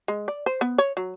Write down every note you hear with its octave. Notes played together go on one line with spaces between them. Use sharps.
G#3
D5
C5
B3
C#5
F#3